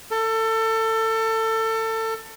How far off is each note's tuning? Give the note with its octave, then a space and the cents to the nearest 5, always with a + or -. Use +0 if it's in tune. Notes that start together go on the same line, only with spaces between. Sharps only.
A4 +25